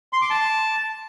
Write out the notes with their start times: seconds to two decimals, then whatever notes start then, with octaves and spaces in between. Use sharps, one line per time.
0.13 C6
0.21 D6
0.30 A5